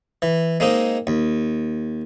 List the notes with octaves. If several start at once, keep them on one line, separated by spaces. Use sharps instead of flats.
E3
G#3 A#3 C4 D#4
D#2